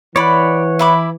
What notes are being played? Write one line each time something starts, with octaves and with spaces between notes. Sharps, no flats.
E3 C#5 D5 F#5 B5
E4 B5 D6